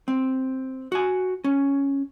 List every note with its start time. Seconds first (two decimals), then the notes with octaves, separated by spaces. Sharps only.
0.08 C4
0.92 F#4 G#5
1.44 C#4